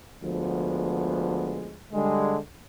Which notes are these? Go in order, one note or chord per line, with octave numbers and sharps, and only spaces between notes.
D2 F3 G#3 B3
D3 G3 G#3